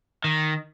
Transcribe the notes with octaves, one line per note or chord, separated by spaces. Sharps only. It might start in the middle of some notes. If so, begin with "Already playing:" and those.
D#3